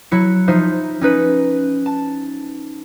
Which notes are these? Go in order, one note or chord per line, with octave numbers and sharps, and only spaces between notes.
F#3 E4 C#7
F3 D#4 F4 C5 E5
C#4 D#4 B4
A5